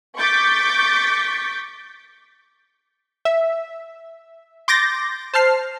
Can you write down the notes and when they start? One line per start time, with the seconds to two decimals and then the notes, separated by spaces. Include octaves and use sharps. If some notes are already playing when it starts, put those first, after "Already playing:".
0.18 C#6 D6 G6 A6 B6
3.25 E5
4.68 C6 D6 G6 A6 A#6
5.34 C5 A5 F6 C7